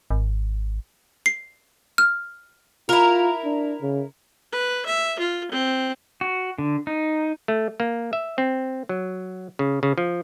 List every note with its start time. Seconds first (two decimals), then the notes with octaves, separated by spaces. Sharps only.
0.11 G#1
1.26 C7
1.98 F6
2.89 E4 F4 A#4
3.44 D4
3.81 C#3
4.52 B4
4.86 E5
5.19 F4
5.52 C4
6.21 F#4
6.58 D3
6.87 D#4
7.48 A3
7.80 A#3
8.13 E5
8.38 C4
8.89 F#3
9.59 C#3
9.83 C#3
9.98 F3